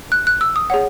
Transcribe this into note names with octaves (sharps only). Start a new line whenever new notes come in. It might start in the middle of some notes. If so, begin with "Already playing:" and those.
F#6
F#6
E6
D#6
G#4 C#5 F#5